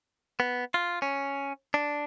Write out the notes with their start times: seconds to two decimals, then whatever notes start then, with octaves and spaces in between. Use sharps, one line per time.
0.40 B3
0.74 F4
1.02 C#4
1.74 D4